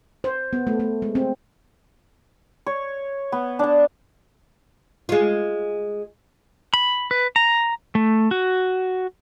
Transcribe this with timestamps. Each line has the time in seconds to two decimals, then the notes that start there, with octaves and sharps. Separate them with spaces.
0.24 C5
0.53 B3
0.67 A3
0.80 A3
1.02 G#3
1.15 C4
2.66 C#5
3.32 B3
3.59 D4 A5
5.09 G#3 F4
6.74 B5
7.11 B4
7.36 A#5
7.95 A3
8.31 F#4